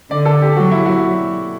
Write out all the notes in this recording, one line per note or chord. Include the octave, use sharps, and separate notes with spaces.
D3 D5
A4
G4
F#3 F#4
E4
F#4